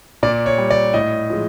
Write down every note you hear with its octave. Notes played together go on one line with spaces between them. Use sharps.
A#2 D5
C#5
G3
D5
A2 D#5
F3 G#3